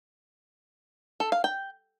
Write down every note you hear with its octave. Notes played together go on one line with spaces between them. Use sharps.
A4
F5
G5